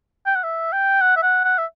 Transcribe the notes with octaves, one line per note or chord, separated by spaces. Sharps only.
G5
F#5
E5
G5
F#5
E5
F#5
F#5
E5